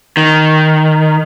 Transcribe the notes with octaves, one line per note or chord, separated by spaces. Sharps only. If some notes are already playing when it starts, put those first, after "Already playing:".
D#3